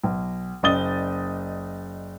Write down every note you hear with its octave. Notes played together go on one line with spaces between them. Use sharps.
B1
F#1 D5 D#5 D#6 A6 G7